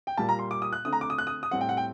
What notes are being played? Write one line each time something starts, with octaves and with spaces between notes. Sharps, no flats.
G5
A#2 G3 A#3 A5
A#5
C6
D6
D#6
F#6
D3 A3 C4 D#6
A#5
D6
D#6
F#6
D#6
D#6
A2 G3 C4 F#5
G5
F#5
G5